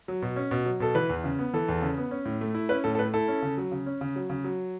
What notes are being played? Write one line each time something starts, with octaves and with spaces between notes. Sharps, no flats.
F#3
B2
C#4
B2
F#3
B2 A4
E3 B4
E2
C#3
B3
E3 A4
E2
C#3
B3
C#4
A2
A3
E4
C#4 B4
A2 A4
A4
A3 B4
E4 A4
C#4
C#3
F#3
C#3
C#4
C#3
F#3
C#3
F#3